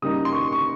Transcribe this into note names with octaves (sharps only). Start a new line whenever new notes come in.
C#3 G3 A#3 D#4 D#6
C6
C#6
C#6